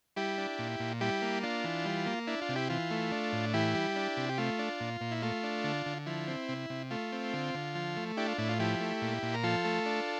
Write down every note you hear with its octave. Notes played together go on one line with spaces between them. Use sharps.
G3 E4 G4
D4
A#2
A#2
G3 E4 G4
A#3
D4 F4
E3
G3
A#3
D4 E4
F4
C3
E4 G4
E3 F4
A3
D4
A2
E3 E4 G4
G3
D4
C3
G4
A3 F4
D4
A#2
A#2
E4
A3 F4
D4
D3
D3
F3 E4
C4
C3
C3
A3 F4
C4
D3
D3
F3
A3
D4 E4 G4
F4
A2 E4
F4
F3 E4 G4
A3
A#2
A#2
A#4
F3 F4 A4
A3
D4